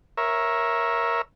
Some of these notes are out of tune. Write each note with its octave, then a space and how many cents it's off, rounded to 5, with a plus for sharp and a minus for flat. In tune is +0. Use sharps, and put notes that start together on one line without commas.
A#4 +10 C#5 -15 E5 +0